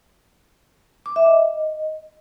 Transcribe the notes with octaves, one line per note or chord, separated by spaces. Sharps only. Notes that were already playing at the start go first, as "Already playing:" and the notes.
D6
E5
D#5